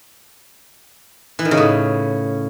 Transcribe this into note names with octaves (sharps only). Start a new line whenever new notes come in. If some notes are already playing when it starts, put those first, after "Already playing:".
E3
D#3
C#3
A2